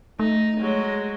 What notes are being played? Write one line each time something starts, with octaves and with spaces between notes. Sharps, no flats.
A3 D#4
F#3 G#3